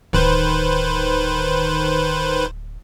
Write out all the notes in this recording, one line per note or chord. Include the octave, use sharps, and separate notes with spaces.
D1 D#3 B4 C5